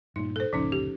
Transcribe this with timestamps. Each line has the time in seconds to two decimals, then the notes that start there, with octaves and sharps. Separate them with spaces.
0.16 G2 A#2 D#4
0.36 A4 C5
0.53 G1 C#2 A#2 F3 C#4 D#4
0.72 G4